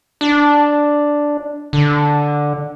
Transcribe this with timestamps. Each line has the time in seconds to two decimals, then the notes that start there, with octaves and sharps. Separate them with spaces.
0.21 D4
1.73 D3